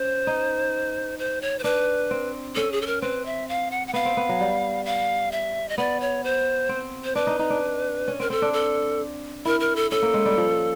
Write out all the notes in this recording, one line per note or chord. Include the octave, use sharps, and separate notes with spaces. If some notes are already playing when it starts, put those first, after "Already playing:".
Already playing: C#4 C5
D#4
C5
C#5
C5
D4 B4
C4
C#4 A4
G#4
A4
A#4
C4 B4
E5
F5
F#5
F#5
B3 F5
C4
B3
F#3
G3
F5
E5
D#5
B3 D5
C#5
C5
C4
C5
D4 B4
D#4
D#4
D4
C#4
C4 A#4
C4 A4
D4
A4
E4 A#4
A#4
A4
C#4 A4
A#3
G#3
G3
F3